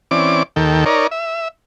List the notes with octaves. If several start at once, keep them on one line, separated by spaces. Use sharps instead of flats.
E3 C4 C#4 D5 D6
D#2 D#3 A4 G5
D#4 A#4 C#5 D5
E5